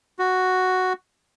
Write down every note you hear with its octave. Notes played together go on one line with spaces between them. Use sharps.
F#4